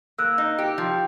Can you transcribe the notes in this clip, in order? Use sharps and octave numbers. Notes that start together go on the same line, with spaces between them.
A#3 E6 F#6
D#4
G4
F3